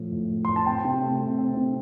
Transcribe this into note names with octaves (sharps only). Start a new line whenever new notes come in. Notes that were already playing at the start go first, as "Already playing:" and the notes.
Already playing: A2 F3 A3
A2
A3
A2 C6
A5
C4 G5
C3
A3
C3
C4
C3